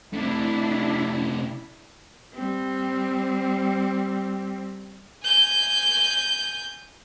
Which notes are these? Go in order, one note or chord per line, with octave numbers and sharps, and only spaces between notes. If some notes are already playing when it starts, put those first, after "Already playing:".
C3 A3 D4 E4
G3 C4
G#5 G6